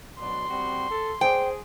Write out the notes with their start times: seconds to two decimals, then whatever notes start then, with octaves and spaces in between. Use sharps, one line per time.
0.20 B2 F#3 D4 C6
0.49 G3 C4 F#4
0.91 A4
1.21 G#4 C5 D5 G5